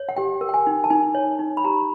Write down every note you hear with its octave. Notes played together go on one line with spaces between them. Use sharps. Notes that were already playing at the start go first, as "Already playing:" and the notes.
Already playing: C#5
F#5
G4 G5
A#4
G5
G#5
D#4
A5
D#4 G#5
C#5
D#4
B5
G4 A#5